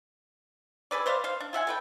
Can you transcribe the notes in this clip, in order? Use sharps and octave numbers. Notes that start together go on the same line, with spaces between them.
G#4 A4 B4 D5
B4 C5 D5 F5
C5 F5
D4
F4 E5 F#5 G#5
A4 B4 G5